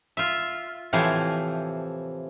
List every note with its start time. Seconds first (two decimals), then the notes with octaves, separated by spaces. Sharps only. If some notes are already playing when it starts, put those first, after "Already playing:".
0.17 F4 E5
0.93 A2 C3 E3 F3 C5 G#5